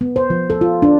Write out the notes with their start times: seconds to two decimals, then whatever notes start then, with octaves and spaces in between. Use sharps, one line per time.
0.01 B3
0.16 C5
0.30 F3
0.50 A4
0.61 F4
0.82 D4